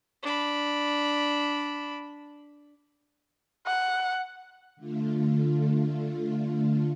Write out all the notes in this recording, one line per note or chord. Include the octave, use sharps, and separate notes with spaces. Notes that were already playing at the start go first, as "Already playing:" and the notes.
D4 B5
F#5
D3 A3 F4